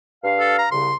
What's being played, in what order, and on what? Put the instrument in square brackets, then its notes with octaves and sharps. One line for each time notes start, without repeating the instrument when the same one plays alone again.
[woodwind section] G2 F5
[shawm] A4
A#5
[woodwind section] C2 C#3 [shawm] C6